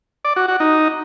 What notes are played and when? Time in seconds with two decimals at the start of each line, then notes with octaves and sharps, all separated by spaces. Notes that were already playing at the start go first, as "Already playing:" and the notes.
0.25 D5
0.36 F#4
0.48 F#4
0.60 D#4